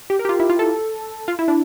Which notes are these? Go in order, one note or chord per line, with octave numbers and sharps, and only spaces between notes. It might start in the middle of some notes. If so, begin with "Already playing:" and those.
G4
A#4
G4
F4
E4
F4
A4
F4
E4
D4